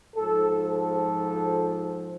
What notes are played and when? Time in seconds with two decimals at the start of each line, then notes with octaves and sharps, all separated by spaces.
0.15 G#2 F3 A4
0.68 A4